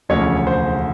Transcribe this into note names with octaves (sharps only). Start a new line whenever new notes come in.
E1 D2 C#3 F3 C#5
C5